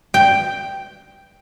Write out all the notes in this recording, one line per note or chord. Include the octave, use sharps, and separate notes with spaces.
G5